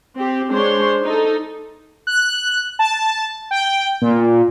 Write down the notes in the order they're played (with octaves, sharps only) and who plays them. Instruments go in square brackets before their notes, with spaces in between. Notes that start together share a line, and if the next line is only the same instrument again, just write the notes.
[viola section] C4 G4
G#3 D4 C5 C#5 C6
D#4 A4
[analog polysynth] F#6
A5
G5
A#2